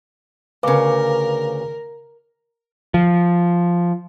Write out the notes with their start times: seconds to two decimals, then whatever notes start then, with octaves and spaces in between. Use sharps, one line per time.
0.63 D2 C#3 A#4 B4 F5 D6
2.94 F3